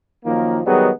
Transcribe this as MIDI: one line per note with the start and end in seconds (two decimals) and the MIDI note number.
0.25 0.60 42
0.25 0.60 51
0.25 0.60 53
0.25 0.60 58
0.66 0.89 51
0.66 0.89 54
0.66 0.89 55
0.66 0.89 59
0.66 0.89 63
0.66 0.89 68